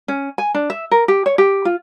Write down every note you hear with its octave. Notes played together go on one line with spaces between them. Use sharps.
C#4
G#5
D4
E5
A#4
G4
C#5
G4
F4